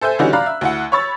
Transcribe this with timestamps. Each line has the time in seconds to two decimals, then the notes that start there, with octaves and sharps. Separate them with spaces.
0.01 A4 C5 E5 G#5 G6
0.19 D3 E3 G3 C#4 D#4 F#4
0.33 D5 F5 A#5 B5 F#6
0.46 E5
0.61 D2 E4 F#5
0.92 C#5 B5 C#6 E6 A6